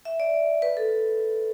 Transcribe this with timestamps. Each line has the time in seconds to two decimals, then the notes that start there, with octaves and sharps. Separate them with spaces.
0.05 E5
0.20 D5
0.62 B4
0.77 A4